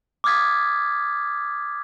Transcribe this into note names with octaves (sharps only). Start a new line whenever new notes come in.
D6 D#6 F6 G#6 A6 B6